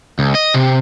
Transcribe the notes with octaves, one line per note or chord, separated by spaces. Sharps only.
C#2
D#5
C3